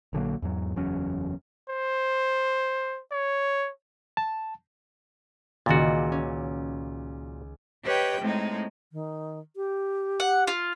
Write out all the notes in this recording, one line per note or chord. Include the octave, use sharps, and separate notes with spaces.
A#1 D3 F#3 A#3
E2 G#2 F#3
F#1 E2 F#3 C#4
C5
C#5
A5
C#2 A#2 D#3 F#4 A6
C#4
G4 B4 C#5 D#5 G5
A2 G#3 C4 D#4
D#3
G4
F#5
F4